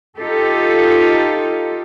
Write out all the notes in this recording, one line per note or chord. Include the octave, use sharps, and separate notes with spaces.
D#4 F4 G4 A4